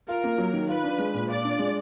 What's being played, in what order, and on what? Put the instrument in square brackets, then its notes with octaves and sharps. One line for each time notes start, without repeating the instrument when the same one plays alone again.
[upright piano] F4 [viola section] A#4
[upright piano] A#3
F#3
D#3
[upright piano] F4 [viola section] B4
[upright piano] D4
G#3
A#2
[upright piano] F4 [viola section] D5
[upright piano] D4
G#3